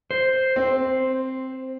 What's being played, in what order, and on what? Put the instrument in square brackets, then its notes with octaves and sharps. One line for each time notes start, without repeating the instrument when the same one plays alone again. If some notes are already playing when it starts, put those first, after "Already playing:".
[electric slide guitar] C5
[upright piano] C4